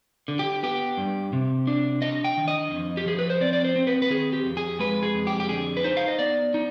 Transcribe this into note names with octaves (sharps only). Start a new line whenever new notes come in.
D3
G4
B3 G4
G2
C3
D4
D4 D#5
G5
D#3
D#5
F2
G4
F3 G#4
B4
C5
C4 D5
D5
C5
C4
B4
B4
D#3 G#4
G4
F2
G#4
G#3 B4
G#4
F2
G4
G4
D3 G#4
B4
D#4 C5
F5
D#5
B3 D5
D#4